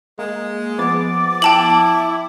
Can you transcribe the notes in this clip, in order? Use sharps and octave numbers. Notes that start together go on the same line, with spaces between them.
G#3 A#3
F3 B3 D6 A6
E4 G5 A5 F#7